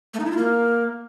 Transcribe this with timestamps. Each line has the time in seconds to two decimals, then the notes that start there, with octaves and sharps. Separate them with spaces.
0.14 A3
0.20 D#4
0.25 E4
0.31 F4
0.37 A#3